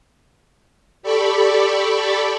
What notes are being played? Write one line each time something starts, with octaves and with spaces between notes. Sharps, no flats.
G4 A4 D5 B5 C#6